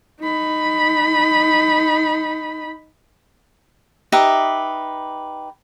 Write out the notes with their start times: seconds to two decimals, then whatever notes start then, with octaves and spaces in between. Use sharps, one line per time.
0.21 D#4 B5
4.12 D#4 G4 B4 E5